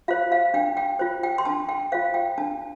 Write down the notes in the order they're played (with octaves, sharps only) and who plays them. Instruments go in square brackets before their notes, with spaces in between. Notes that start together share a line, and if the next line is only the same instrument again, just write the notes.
[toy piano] F4 C5 F5
F5
D4 G5
G5
F4 C5
G5
C6
D4 A5
G5
F4 C5 F5
G5
D4 A5